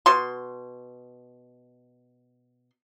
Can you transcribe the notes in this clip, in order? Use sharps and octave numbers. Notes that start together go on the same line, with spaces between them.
B2 C6